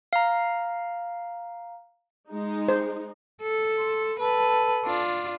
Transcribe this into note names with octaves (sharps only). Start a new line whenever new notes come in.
F5 A#5
G#3 D#4
C5
A4
C6
A4 B4
D4 F4